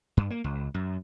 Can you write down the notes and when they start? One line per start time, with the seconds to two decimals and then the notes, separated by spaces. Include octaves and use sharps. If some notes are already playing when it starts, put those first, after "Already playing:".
0.17 G2
0.30 A#3
0.44 C#2
0.74 F#2